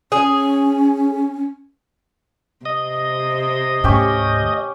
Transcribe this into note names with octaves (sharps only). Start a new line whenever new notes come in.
C#4 G#4
C3 D#5
D2 G#2 C#4 G4 C#6